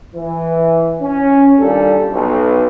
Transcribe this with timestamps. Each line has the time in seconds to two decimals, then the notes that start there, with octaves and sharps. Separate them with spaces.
0.16 E3
1.02 C#4
1.60 A#2 D#3 G3 D4 F4 A4
2.12 B1